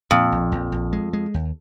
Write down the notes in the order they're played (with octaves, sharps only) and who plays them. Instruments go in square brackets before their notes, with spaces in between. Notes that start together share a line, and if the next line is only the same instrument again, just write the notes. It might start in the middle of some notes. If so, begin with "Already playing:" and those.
[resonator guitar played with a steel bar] F2 [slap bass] A#2
[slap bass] A#1
A#1
A#1
G#3
G#3
D#2